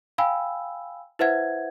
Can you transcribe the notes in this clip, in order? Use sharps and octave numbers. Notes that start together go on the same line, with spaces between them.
F5 G5 G#5 B5 E6
E4 B4 C5 E5 F#5 G#6